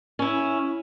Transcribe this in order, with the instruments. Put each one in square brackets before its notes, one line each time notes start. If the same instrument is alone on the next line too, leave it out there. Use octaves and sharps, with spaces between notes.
[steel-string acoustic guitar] C#4 E4